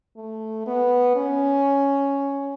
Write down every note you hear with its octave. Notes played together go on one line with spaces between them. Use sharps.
A3
B3
C#4